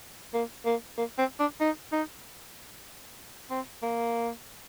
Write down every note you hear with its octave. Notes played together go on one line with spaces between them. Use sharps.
A#3
A#3
A#3
C4
D4
D#4
D#4
C4
A#3